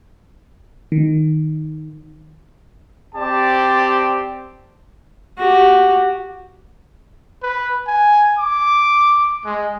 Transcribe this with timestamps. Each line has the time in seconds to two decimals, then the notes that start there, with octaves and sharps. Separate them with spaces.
0.92 D#3
3.15 C4 G4 D5 A5
5.38 F#4 G4
7.43 B4
7.87 G#5
8.39 D6
9.45 G#3